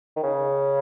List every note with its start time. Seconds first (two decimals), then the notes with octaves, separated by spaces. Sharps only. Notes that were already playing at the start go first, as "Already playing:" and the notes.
0.17 D#3
0.23 C#3